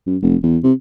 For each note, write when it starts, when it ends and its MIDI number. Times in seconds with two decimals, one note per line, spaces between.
0.07 0.17 42
0.22 0.36 29
0.43 0.58 40
0.63 0.73 48